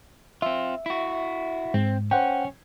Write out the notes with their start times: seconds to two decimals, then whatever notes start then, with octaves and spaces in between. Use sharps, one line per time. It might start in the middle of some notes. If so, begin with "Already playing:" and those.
0.42 C4 F4 E5
0.86 E4 F#4
1.74 G#2 C4
2.11 C#4 C5 F#5 G5